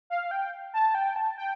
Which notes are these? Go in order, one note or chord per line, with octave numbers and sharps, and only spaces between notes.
F5
G5
A5
G5
A5
G5